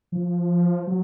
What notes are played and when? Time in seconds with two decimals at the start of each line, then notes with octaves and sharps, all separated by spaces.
0.12 F3
0.87 F#3